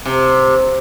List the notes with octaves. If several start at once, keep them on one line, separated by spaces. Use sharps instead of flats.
C3